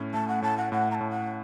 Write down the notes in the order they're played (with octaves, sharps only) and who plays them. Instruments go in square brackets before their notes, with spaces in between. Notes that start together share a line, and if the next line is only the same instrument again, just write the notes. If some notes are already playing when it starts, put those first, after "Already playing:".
Already playing: [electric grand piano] A2 C#4
[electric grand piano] A3 [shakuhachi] A5
[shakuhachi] F#5
[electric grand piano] A2 [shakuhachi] A5
[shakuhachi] F#5
[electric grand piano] A2 [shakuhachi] F#5
[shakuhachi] A#5
A5
[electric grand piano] A2
[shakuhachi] F#5